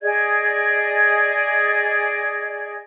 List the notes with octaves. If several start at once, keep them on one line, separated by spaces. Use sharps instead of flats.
G#4 D5 D#5 G#6